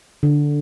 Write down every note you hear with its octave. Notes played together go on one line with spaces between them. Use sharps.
D3